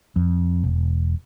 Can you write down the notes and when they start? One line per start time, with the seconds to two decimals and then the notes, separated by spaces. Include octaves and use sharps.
0.16 F2
0.64 E1